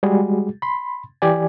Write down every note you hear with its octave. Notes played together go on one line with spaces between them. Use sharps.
G3 G#3 F#4 G#4
B5 C6
E3 G4 D5 G#5